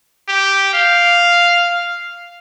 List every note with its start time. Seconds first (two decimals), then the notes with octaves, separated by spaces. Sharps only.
0.28 G4
0.74 F5